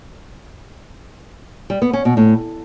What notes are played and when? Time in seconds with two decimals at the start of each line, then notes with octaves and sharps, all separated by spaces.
1.70 G3
1.82 B3
1.93 C#4
2.05 B2
2.17 A2